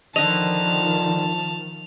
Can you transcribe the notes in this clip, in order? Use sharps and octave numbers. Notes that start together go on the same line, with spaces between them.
D3 D#3 F3 D#5 A5 F7